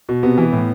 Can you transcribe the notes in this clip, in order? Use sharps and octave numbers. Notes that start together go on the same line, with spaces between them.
B2
C3 B3
E3
A2